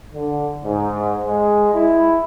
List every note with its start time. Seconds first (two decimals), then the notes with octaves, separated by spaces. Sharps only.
0.13 D3
0.65 G#2
1.26 G#3
1.74 E4